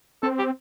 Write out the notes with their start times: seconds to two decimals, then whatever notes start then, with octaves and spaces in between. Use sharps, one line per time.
0.23 C4 A4
0.39 G4